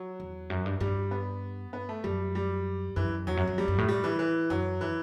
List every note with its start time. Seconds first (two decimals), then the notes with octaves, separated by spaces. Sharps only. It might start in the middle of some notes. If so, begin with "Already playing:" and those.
Already playing: F#3
0.20 E2
0.50 F#2
0.66 G2
0.80 G2 G3
1.11 B3
1.73 B3
1.89 A3
2.04 F#2 G3
2.35 G3
2.96 F#2 E3
3.26 E2 F#3
3.37 F#2
3.47 F#2
3.58 E2 G3
3.68 F#2
3.78 A2
3.88 G3
4.04 E3
4.19 E3
4.50 F#2 F#3
4.81 E3